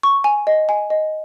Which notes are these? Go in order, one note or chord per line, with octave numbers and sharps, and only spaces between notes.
C#6
G#5
D#5
G#5
D#5